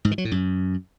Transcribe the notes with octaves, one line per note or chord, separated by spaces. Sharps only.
G#2
D#3
F#3
A2
F#2